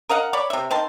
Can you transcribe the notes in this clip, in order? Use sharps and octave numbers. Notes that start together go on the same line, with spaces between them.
A#4 D#5 F5 F#5
C#5 D5 B5
C3 E5
D#3 C4 A5 C6